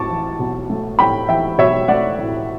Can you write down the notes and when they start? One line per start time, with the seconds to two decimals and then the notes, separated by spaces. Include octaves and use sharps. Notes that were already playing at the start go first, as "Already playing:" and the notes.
Already playing: A2 A5 C#6 D6
0.10 E3
0.39 B1
0.70 A3
0.99 A2 G5 B5
1.28 E3 E5 G5
1.58 B1 C#5 E5
1.88 A3 D5 F#5
2.19 A2